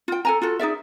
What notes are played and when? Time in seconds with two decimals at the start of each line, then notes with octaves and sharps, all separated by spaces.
0.08 F4 G5
0.25 A4 G#5 A#5
0.42 F4 F#4 A4
0.59 D#4 G#4 D5 E5